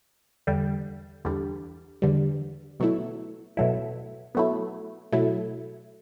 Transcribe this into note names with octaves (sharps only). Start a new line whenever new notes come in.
E2 D3 G3
E2 D3 G3
E2 D3 G3
B2 F#3 A3 E4
B2 F#3 A3 E4
B2 F#3 A3 E4
B2 F#3 A3 E4